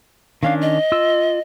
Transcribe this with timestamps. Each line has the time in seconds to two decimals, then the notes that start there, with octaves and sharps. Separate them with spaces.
0.43 D#3 C#4 D4 F5
0.61 D#5
0.92 F4 E6